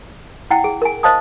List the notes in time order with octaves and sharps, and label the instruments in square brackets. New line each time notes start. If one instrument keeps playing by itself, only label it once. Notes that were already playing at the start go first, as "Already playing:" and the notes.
[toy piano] E4 F#5 G5
G#4
A#4 G#5
C5 D#5 F5 A5 D#6